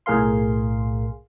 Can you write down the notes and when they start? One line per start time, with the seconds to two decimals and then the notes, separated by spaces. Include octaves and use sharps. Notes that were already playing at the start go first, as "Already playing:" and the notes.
0.06 B1 A2 G#4 A#4 F5 C6